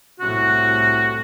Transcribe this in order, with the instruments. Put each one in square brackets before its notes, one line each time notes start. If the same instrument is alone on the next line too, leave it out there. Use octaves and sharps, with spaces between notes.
[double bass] C2 A2 [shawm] F#4